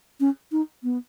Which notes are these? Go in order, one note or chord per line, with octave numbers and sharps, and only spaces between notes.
C#4
D#4
B3